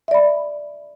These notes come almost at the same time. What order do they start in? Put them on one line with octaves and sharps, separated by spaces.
E5 D5 B5